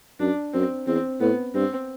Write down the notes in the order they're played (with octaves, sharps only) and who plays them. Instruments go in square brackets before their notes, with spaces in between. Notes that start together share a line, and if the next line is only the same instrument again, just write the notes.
[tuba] F#2 [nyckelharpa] D4
[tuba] F#2 [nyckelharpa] C4
[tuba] E2 [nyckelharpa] C4
[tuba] A2 [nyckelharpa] B3
[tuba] G2 [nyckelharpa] C4